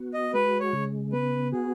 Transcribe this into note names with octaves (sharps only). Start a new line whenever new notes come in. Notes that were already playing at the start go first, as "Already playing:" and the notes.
Already playing: B3 F#4
D#5
G#3 B4
C#5
C#3
B3 B4
F#4 G#4